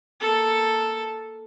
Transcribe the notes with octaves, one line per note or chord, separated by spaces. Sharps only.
A#3 A4